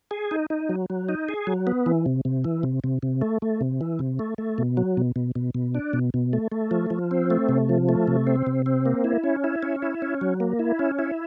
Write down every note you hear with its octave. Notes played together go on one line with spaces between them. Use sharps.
G#4
D#4
D#4
F#3
F#3
D#4
G#4
F#3
B3
E3
C3
C3
E3
C3
C3
C3
A3
A3
C3
E3
C3
A3
A3
B2
F#3
B2
B2
B2
B2
D4
B2
B2
A3
A3
F3
F3
C4
A3
C3
F3
A3
C3
C4
C3
C4
A#3
E4
C#4
E4
C#4
E4
C#4
F#3
A#3
E4
C#4
E4